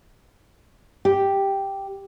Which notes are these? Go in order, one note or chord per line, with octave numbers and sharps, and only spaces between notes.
G4